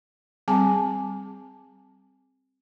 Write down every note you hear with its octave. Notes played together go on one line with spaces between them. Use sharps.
G3 C4 G#4 G#5 A5 D6